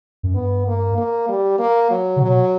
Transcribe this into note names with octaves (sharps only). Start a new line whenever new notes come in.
F#2
G2 B3
A#3
A#3
G3
A#3
F#3
C#3
B2 F#3